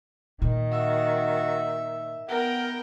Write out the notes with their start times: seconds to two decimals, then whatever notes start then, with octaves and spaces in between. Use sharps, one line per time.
0.42 A#2 D#3
0.72 F#4 E5
2.29 B3 A#4 F#5 G5